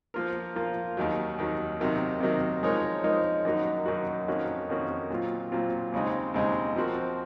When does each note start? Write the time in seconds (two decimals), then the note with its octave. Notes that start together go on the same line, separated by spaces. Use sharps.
0.14 F3 A#3 F4 A#4
0.56 F3 A#3 F4 A#4
0.97 D#2 D#3 F#3
1.38 D#2 D#3 F#3
1.80 C3 D#3 F#3 A#3
2.20 C3 D#3 F#3 A#3
2.63 F3 G#3 D#4 A#4 C#5
3.04 F3 G#3 D#4 A#4 C#5
3.45 F#2 D#3 A#3 D#4 F#4
3.86 F#2 D#3 A#3 D#4 F#4
4.28 F2 D#3 A#3 C#4 F#4
4.69 F2 D#3 A#3 C#4 F#4
5.10 A#2 F#3 C4 F4
5.52 A#2 F#3 C4 F4
5.92 D#2 C#3 G#3 C4 D#4
6.34 D#2 C#3 G#3 C4 D#4
6.76 F3 C4 F#4 A#4